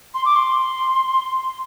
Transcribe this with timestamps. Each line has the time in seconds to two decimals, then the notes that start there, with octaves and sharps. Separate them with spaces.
0.14 C6
0.25 D6
0.36 C6